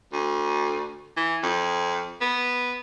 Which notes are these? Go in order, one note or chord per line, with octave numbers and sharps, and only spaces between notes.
D2
E3
F2
B3